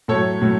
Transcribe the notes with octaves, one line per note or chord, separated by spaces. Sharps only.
A2 F#3 A3 A4 C#5
A2 F#3 A3